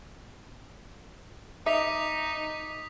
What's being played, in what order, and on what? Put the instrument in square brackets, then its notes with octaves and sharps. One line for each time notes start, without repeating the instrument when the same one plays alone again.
[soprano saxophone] D#4 [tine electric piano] D#5 D6 [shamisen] E5 [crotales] D#6 B6 F7